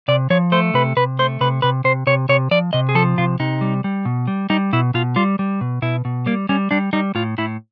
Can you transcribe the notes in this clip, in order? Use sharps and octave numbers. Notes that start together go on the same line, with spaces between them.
C3 D5
F3 C#5
A3 C5
C3 B4
C3 B4
A3 C5
C3 B4
C3 B4
C3 C5
C3 C#5
C3 C#5
F3 D5
C3 D#5
G#4
F3 A4
C3 F4
C3 D#4
G3
G3
B2
G3
G3 D#4
B2 E4
B2 F4
G3 F4
G3
B2
B2 E4
B2
G3 A#3
G3 C#4
G3 D4
G3 D#4
A2 F4
A2 E4